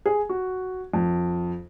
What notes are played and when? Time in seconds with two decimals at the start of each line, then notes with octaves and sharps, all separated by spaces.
0.06 G#4
0.29 F#4
0.94 F2